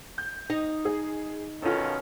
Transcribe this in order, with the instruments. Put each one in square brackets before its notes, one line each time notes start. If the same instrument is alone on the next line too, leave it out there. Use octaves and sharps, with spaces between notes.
[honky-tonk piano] G6
[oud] D#4 D#5
[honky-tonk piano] G#4
[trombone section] B2 D#3 C#4 [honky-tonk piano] F4 A4